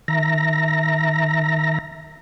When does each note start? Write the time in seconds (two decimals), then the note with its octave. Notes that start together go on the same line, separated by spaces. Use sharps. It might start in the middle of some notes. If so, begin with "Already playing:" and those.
0.08 D#3 E5 A#5 A#6